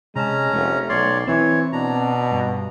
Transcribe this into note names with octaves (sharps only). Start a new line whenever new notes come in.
C3 G#3 C#4 A5 A#5
F1 A3
B1 C#5 D5 C6
E3 C4 C#5
B2 D4 A#5
G2